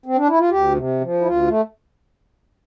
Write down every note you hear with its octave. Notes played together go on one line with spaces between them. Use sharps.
C4
D4
E4
F4
D2 G4
C3
F3
E4
D2 F4
A3